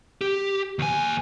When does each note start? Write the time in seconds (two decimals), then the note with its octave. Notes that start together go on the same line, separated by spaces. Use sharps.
0.21 G4
0.79 D#2 G#5